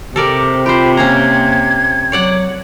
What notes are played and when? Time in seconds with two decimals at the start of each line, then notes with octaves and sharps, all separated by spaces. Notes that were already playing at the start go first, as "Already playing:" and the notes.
0.16 C3 C4 G4 A4 A#4 D5
0.66 F4 G4 C5 B5
0.97 A#3 C#4 C5 A#5 G#6
2.12 F#3 C#5 D5 F#5